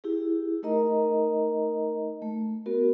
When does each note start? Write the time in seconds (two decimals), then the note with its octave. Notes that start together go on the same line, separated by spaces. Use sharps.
0.04 E4 G4 G#4
0.63 A3 D#4 A#4 D#5 A#5
2.22 A3
2.66 B3 F#4 A#4